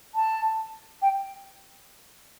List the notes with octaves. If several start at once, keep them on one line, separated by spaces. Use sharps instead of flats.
A5
G5